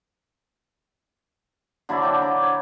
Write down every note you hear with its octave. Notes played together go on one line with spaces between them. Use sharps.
D3 F#3 E4 D5
D4 G5
A#5 D6
C#5